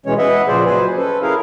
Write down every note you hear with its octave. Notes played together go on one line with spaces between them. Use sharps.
B2 E3 G#3 C#4 C#5
B4 D#5 E5 F#5
A#2 C#3 F3 G#4 C5 D5
F#3 B4 C5 G#5
C#4 A4 B4
E4 G#4 A#4 F5